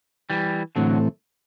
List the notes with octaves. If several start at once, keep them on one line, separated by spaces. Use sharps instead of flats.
E3 G3
A2 D3 E3 F#3 A3 C4